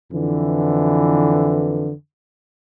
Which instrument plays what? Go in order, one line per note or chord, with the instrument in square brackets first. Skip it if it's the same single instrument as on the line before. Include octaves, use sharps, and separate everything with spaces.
[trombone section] F2 D3 E3